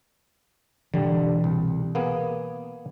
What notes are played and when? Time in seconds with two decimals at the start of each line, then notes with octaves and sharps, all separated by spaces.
0.94 B2 D3 E3 G3
1.44 C2
1.95 A#3 B3 G#4